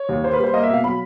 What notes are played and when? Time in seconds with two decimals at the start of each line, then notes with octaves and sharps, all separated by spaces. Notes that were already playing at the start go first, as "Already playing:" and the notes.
Already playing: C#5
0.09 D#2
0.23 A#3 C5
0.33 B4
0.39 G3 C5
0.54 A#3 D#5
0.63 E5
0.70 B2 F5
0.84 F#3 B5